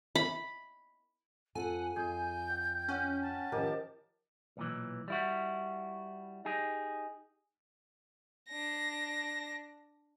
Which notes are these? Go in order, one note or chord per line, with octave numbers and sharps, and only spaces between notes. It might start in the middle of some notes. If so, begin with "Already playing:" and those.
B5
F2 A4 F#5 G#5
F2 G#4 G6
G5
C#4 C#5 F#5 G5
A5
D#3 F3 G4 A#4 D#5
B1 A#2 E3
G3 E4 F#4
D#4 G4 G#4
D4 A#6